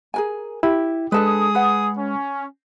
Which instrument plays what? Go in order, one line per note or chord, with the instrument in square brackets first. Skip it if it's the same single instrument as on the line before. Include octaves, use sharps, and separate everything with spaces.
[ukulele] G#4 A#4 G#5
[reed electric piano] E4 [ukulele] G4
[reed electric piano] G#3 [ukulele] D4 A4 B4 [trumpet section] G#4 D#6
[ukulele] B4 F#5
[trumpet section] C#4